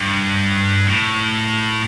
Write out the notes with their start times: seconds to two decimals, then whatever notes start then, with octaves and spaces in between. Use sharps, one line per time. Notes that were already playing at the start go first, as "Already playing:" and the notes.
Already playing: G2
0.87 A2